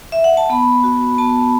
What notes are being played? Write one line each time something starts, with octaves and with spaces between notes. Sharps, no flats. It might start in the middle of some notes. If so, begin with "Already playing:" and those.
E5
F#5
A5
B3 B5
F#4
B3 A5